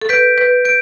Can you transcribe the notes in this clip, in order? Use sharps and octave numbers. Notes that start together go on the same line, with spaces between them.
A4
B4 G6 B6 D7
B4
G6 D7